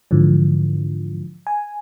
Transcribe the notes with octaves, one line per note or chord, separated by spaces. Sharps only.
G#2 D3 E3 F3
G#5